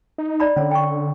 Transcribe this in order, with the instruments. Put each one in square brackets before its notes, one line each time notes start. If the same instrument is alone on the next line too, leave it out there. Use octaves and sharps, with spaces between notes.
[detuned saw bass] D#4
[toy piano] D5 A#5 B5
[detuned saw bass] D3 [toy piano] C#4 C#5
[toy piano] G5 C#6